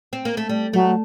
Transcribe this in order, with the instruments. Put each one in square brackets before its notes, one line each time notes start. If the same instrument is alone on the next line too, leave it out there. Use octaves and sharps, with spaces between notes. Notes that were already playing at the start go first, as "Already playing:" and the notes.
[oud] C4
A#3
A3
G3
[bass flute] F#3 [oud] A3